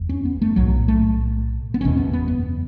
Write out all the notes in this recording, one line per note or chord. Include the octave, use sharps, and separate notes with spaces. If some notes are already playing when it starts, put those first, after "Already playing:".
Already playing: F#1 E2
C#4
B3
A3
B1 A2 F#3
A3
B3
F#1 E2 B2 C#4
B3
B3
B3